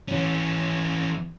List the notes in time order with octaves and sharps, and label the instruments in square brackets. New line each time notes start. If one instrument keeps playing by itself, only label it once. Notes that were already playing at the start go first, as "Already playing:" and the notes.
[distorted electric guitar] E3 C#4